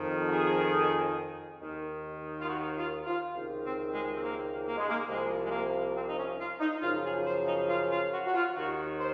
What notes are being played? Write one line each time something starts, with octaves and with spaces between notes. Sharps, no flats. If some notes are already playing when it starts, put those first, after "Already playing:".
Already playing: F2 D#3
F#4
G#4
D#2 D#3
F4
F#4
F4
F4
C#2 C3 D#3
C4
G#3
C4
A#3
A#3
G#3
A#3
C2 C3 F3 G#3
G#3
A#3
C4
D#4
C#4
F4
D#4
F#2 C#3 F3 F4
G#4
C5
D#4
F4
F4
F#4
F#4
F4
D#2 D#3 F#4
C5